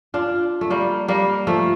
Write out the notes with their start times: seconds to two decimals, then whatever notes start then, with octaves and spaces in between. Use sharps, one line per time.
0.14 D4 F4
0.61 A3
0.70 G3 A#3
1.08 G3 A#3
1.47 F3 A3